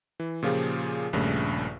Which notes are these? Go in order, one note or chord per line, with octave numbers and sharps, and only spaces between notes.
E3
A#2 C#3 F3 F4 G4 G#4
A#1 G2 C#3 A3